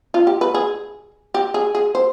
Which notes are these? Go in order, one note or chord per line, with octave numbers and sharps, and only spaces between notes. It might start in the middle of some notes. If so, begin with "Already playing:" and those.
F4
G4
B4
G#4
G4
G#4
G#4
C5